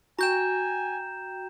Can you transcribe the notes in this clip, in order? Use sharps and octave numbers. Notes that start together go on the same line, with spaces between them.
F#4 G5 G#5 A#5 G6 E7